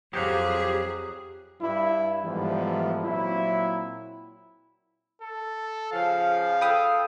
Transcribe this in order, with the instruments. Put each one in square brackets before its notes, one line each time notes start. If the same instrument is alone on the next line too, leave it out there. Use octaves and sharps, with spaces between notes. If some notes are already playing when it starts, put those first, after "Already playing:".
[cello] F2 G#4 [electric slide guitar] F#3 C5 F5 [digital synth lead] G4 [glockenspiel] D#6 F#6
[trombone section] G2 E4
G#2 E3 F3 G3 A3 B3
A#2 F#3 C4 E4
[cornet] A4
[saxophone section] C#3 F3 [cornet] F5
[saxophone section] A4 [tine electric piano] G5 B5 D#6